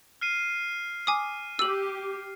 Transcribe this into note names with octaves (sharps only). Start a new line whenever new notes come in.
F6 C7 D#7
G#5 D6 D#6
G4 E6 F#7